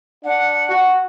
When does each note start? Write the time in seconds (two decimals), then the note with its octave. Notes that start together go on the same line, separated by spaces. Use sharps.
0.24 D4 F#5
0.69 F#4